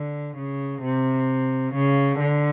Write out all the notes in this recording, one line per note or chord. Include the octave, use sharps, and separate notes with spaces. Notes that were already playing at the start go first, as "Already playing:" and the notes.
Already playing: D3
C#3
C3
C#3
D3